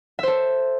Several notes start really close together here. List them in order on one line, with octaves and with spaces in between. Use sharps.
E5 C5 A4